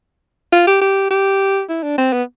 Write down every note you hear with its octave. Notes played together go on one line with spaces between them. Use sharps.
F4
G4
G4
G4
E4
D4
C4
B3